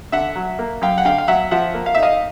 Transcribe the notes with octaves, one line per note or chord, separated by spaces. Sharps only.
D3 E5 F#5
F#3
A#3
F#2 F5 G5
F#5
D3 F5 G5
F5
F#3 E5 F#5
F3 E5 F#5
A#3
F5
D#4 E5
D#5 F5